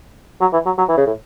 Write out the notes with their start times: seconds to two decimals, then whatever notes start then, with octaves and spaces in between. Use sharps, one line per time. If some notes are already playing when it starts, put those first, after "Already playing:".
0.41 F#3
0.53 E3
0.66 F#3
0.78 F#3
0.89 E3
0.97 C#3
1.07 A2